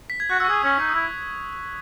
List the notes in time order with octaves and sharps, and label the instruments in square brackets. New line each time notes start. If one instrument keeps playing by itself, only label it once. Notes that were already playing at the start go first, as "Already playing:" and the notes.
[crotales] B6
G#6
[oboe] F#4 [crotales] F#6
[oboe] F#4 [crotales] E6
[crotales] C#6
[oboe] G#4 [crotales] D#6
[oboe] C#4
[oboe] D#4 [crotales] C#6
[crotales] D#6
[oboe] E4
[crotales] E6